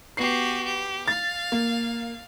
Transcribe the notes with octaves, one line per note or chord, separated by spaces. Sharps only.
B3 F#4 G4 C7
G4
F5 A6
A#3